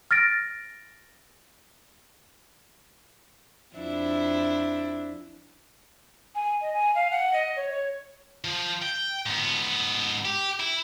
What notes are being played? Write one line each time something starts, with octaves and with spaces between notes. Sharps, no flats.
F6 A6 A#6 D7
F2 D4 E4
G#5
D#5
G#5
F5
F#5
D#5
C#5
C#5
F3
G5
G#2 B3
G4
E4